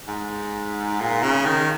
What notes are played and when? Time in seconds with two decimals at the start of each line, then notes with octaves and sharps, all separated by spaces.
0.08 G#2
1.01 A#2
1.23 C#3
1.45 D#3